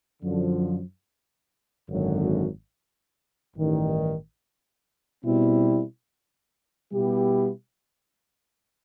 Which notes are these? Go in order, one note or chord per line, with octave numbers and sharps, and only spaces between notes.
F#2 D3 F3
G#1 F#2 D3 F#3
A1 G2 D#3
B2 G3 C4 E4
B2 G3 B3 E4 G4